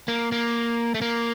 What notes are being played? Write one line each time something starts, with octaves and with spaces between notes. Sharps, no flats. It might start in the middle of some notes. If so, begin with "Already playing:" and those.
A#3
A#3
A3
A#3